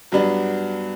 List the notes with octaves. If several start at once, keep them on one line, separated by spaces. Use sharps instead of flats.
G2 F#3 B3 D4